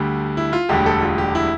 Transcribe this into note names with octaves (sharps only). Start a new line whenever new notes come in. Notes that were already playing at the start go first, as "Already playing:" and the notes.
Already playing: D2 D3 G3
E4
F4
E1 D2 D3 G3 G4
A4
F4
G4
E4